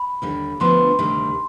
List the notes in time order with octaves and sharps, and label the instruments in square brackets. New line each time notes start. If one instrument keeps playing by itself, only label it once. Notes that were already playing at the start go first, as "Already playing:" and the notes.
Already playing: [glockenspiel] B5
[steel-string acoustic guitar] D#2 D3 G3
[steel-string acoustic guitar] D2 D3 F3 B3 D4 [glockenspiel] C6
[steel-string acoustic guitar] D2 C3 D#3 G3